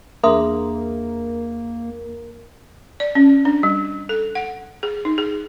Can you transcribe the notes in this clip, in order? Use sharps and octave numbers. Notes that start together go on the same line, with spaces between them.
E2 A#3 D4 G#4 A#4 E5 C6 D#6
D5
C#4
D4
G3
A4
F#5
G#4
D#4
G#4